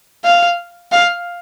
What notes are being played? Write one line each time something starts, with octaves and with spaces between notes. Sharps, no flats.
F5
F5